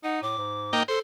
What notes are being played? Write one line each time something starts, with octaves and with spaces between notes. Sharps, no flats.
D#4 F#5
A2 D6
G#2
A#3 D#4 G5
A4 C5